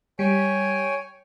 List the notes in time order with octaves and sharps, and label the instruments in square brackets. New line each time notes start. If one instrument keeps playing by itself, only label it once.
[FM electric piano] G3 [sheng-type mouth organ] C#5 G5 G#5